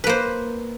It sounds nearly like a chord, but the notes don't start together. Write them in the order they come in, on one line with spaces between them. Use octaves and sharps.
B4 A#3 C5